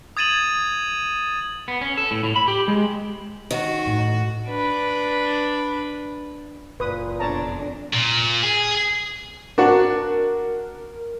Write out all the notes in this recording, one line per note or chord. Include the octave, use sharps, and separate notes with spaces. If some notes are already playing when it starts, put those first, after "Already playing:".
D#6 G#6 A6 D#7 E7 F#7
B3
C#4
A4
A2
A2
B5
G4
G#3
D#3 F#4
A2
D4 B4
F#1 A#2 B4 D#6
F2 B2 D4 C#5 A5 A#5
A#2
G#4
D4 F#4 A#4